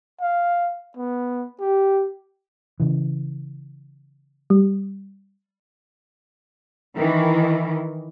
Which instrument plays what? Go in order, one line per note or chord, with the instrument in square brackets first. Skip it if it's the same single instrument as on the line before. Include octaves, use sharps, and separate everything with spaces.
[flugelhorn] F5
B3
G4
[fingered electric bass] C#3 E3
[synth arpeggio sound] G3
[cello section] D#3 E3